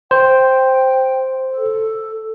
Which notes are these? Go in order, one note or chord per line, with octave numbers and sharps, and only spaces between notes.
C5 G5
A4